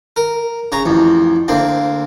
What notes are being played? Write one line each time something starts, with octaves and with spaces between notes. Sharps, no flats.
A#4
C#3 C#5 A#5
A1 F2
D2 A#3 C4